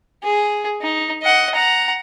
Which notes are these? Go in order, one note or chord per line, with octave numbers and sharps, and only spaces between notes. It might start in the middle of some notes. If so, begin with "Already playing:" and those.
G#4
D#4
D#5 F#5
F#5 A#5